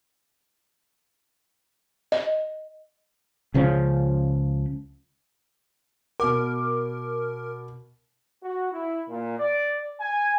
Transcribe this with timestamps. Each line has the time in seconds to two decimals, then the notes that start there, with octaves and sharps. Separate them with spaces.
2.12 D#5
3.54 C#2 C#3 F3 C#4
6.20 B2 A#4 D6
8.43 F#4
8.73 E4
9.09 A#2
9.39 D5
10.00 G#5